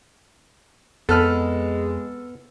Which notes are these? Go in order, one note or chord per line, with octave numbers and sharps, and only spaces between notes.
F2 G#3 B3 A4 B4 F6